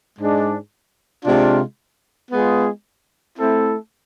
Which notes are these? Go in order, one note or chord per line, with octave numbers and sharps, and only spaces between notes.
G#2 G#3 D4 G#4
C3 G#3 D4 F4
G#3 B3 F4 G#4
A3 C4 E4 A4